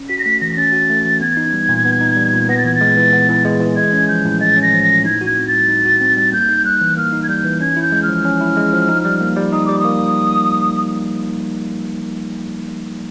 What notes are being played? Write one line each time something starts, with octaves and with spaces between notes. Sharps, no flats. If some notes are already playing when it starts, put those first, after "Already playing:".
Already playing: C#4
F#4 B6
A#6
A3 B6
E3 A#6
A#6
C#4 A6
F#4
A3
E3
B3 G#6
D#4
G3
A#2
B3
D#4
G3
A#2
B3 A#6
A6
E3 G#6
A6
G#3
E3
B3
E3
G#3
E3
G#3 G#6
C#4
F3 G6
A2
G#3 A6
C#4
A#6
F3
A#6
A2
D#4 G#6
F#4 G#6
C4
A6
G3
D#4
F#4
C4
G3
A#3 G6
D#4
G3 F#6
E3
A#3 F6
D#4
G#6
G3 G6
E3
C#4 G#6
E4
G6
G#3
F6
F3
C#4
E4
G#3
F3
D#4
G3
A#3
G3
D#4 D#6
G3 D6
D#6
A#3